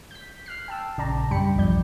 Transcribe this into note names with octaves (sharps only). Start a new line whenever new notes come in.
G6 B6
F6 F#6 C7
G5 A5 E6
A#1 C#3 D5 A5 A#5
F#2 G3 D4 G5 B5 C#7
B1 E2 G2 F3 D5 G6